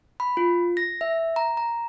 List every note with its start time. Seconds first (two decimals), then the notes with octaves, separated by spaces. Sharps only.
0.20 B5
0.37 F4
0.77 A#6
1.01 E5
1.36 A#5
1.57 A#5